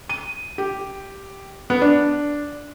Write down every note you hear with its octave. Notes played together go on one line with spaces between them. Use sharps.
D#7
G4
B3
D4